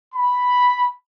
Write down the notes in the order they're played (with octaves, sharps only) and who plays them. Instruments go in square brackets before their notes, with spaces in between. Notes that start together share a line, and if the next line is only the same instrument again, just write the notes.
[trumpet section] B5